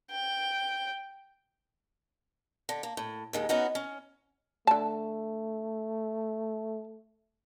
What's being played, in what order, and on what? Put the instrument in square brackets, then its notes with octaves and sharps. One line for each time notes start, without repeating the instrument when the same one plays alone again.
[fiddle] G5
[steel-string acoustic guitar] D3
A#3
A2
D#2 D#3 G#3
B3 C#4 D#4 F#4
C#4
[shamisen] D3 A5 [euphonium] A3